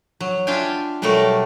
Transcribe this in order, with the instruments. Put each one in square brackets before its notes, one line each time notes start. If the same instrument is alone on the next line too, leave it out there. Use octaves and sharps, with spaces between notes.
[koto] F#3
D4 F4 E5 F5 G5 G#5
B2 F#3 G3 A3 A4 A#4